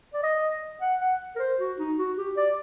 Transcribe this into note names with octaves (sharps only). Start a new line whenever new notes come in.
D5
D#5
F#5
F#5
A#4
C5
F#4
D#4
F#4
G4
D5